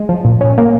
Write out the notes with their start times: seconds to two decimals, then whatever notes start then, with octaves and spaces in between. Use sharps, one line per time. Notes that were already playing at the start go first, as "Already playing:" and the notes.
Already playing: G#3
0.09 F3
0.25 A#2
0.41 C#4
0.58 A#3